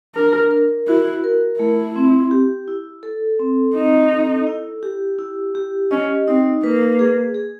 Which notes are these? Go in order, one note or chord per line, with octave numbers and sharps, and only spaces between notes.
D4 A#4
A#4
E4 F#4
A#4
A3 E4
C4
G4
E4
A4
C4
C4 D#4
A4
E4
G4
E4
G4
C#4 D#5
C4 D#4
A#3 B4
G#4
G#4